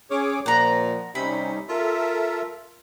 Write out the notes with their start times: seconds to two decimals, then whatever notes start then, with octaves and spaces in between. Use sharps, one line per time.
0.11 C#4 G#4 C#5 D6
0.46 A#2 F3 F#5 A#5
1.15 C3 G3 C#4 D#4 B5
1.69 F4 A4 A#4 E5